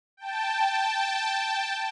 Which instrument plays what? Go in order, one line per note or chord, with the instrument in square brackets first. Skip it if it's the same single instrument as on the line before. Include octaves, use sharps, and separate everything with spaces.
[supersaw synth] G5 A5